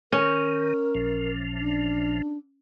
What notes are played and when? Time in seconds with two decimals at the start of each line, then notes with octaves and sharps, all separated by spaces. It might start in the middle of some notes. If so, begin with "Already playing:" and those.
0.12 D#3 C#4 A#4
0.95 A1 A#2 F3
1.60 D4